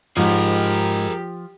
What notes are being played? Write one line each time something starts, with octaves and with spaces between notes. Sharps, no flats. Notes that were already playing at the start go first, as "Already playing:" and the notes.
G#2 F3 D#4 G4 G#4 A#4